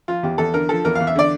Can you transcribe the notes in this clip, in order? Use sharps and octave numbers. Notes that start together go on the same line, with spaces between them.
F3 F4
E2 G4
E2 A4
D3 A#4
F3 A4
E2 A#4
E2 F5
E5
D3 D5